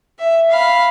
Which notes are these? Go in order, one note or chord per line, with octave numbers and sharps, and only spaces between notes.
E5
F5 B5